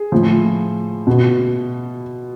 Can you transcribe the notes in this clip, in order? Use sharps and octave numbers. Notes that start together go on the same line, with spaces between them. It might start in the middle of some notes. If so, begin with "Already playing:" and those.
Already playing: G#4
A2 F3
B2